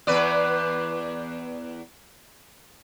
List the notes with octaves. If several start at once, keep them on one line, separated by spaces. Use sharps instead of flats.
E2 B4 D5